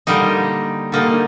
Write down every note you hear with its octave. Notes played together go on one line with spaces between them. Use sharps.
D3 G3 A#3 D#4
D3 G3 A#3 D#4